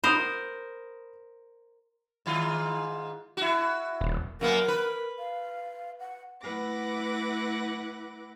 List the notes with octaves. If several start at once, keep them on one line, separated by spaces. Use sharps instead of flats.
A#4 C5 B5 D#6
G#2 D#3 F4
E4 F#4
D#1
F#2 A#3 B3 A#4
B4
F5
F#5
A3 E4 B4 F#5 D6 A#6